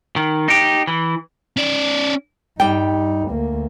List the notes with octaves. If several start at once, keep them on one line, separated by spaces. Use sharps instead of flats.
D#3
D#4 G4
E3
C#4 D5
G2 G3 D#4 G5
D2 A#3